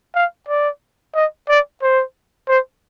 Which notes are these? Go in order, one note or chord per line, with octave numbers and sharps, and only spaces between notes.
F5
D5
D#5
D5
C5
C5